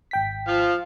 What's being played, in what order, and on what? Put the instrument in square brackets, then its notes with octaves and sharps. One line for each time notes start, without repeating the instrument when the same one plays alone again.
[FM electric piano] G#1 G5 B6
[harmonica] F3 F5